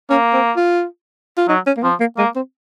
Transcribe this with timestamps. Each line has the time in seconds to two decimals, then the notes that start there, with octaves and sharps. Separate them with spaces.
0.10 A#3 C#4
0.33 C4
0.57 F4
1.38 F4
1.48 F#3 D#4
1.67 C#4
1.77 A#3
1.83 F3 C4
2.00 A#3
2.18 G#3 A#3
2.36 C4